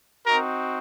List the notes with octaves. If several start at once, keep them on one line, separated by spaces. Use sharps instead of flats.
C4 D#4 F#4 A#4